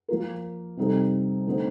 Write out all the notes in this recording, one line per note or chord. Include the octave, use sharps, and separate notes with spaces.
F3 A#3 F4 A#4
C3 G3 C4 D#4 A4
D3 A3 C4 D#4